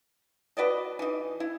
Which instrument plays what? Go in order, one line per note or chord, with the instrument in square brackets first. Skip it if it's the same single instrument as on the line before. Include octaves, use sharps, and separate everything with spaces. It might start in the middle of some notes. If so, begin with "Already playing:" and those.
[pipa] F#4 B4 D5 D#5
E3 D#4
E4